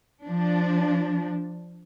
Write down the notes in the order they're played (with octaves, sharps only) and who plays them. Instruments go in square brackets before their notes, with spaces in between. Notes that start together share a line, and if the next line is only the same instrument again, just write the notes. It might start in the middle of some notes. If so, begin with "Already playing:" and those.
[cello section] F3 D4